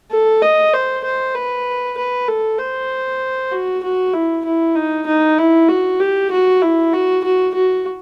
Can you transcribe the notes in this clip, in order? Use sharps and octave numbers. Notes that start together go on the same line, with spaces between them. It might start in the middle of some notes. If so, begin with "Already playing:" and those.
A4
D#5
C5
C5
B4
B4
A4
C5
F#4
F#4
E4
E4
D#4
D#4
E4
F#4
G4
F#4
E4
F#4
F#4
F#4